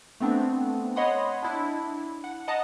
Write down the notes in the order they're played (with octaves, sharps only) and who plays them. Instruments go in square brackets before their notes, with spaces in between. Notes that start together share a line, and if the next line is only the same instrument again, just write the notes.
[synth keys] A3 B3 C4 D4
C#5 D#5 F#5 B5 C6 D#6
D4 E4
F#5
D#5 F#5 A5 A#5 D#6 F#6